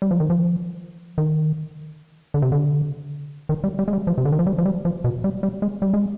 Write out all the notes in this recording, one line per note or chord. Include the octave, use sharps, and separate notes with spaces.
G3
F3
D#3
F3
D#3
D3
C3
D3
D#3
G3
G3
G#3
G3
F3
C3
D3
D#3
F3
G3
F3
G3
F3
B2
G3
G3
G#3
G3
G#3